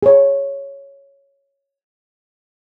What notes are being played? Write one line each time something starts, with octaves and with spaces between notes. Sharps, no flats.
G#4 C#5